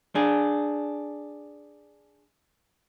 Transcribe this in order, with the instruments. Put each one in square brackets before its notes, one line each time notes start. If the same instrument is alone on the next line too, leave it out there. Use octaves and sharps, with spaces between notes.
[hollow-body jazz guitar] D4 G#4